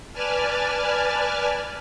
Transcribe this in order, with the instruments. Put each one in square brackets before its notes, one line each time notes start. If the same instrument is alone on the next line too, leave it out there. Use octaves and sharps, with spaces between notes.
[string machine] B4 D5 G#5 A5 F6